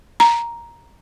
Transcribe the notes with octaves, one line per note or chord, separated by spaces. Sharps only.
A#5